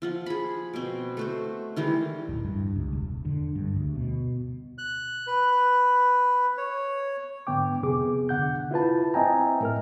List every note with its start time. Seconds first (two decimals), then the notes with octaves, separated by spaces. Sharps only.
0.02 F3 F4 F#5
0.26 G#4 B5
0.73 B2 C4
1.17 A3 F#4 C5
1.76 D#3 E3 G3 G#3
2.29 D1
2.45 G2
2.76 C#2
2.93 E1
3.25 D3
3.56 G2
3.76 D2
3.96 B2
4.78 F#6
5.27 B4
6.57 C#5
7.47 G#2 D3 B3 G5 D6
7.83 F2 C3 B3 G#4 D6
8.29 D3 F#5 G6
8.71 E4 F4 B4 A5
9.14 C4 D#5 E5 G5 G#5 A#5
9.61 A2 A#4 F6